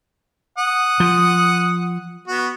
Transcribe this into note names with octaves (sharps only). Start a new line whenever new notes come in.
F#5 D#6
F3
B3 F#4